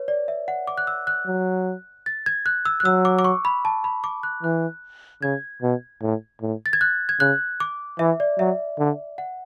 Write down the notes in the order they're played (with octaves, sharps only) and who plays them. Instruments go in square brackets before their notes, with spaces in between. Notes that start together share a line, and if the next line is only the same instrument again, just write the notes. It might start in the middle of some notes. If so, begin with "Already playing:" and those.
Already playing: [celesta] B4 C#5
D5
E5
F#5
D6
F#6
E6
F#6
[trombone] F#3
[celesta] A6
G#6
F#6
E6
F#6
[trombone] F#3 [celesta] E6
[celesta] D6
D6
C#6
B5
A5
B5
D6
F#6
[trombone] E3 [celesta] F#6
[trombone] C#3 [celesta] G#6
[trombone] B2
A2
A2
[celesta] A6
G#6
F#6
G#6
[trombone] C#3 [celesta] F#6
[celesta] D6
[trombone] E3 [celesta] E5
[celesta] D5
[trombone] F#3 [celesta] E5
[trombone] D3
[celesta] F#5